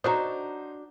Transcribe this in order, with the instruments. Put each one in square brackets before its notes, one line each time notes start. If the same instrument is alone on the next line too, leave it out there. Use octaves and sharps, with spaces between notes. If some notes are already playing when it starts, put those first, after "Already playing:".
[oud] D4 F#4 C#5 [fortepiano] D#4 C5 [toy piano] A#5 D#6